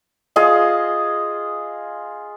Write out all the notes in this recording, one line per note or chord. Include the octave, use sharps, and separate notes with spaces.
F4 G#4 D#5 F5